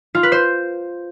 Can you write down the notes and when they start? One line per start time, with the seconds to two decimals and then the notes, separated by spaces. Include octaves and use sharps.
0.15 F4
0.23 B4
0.32 C5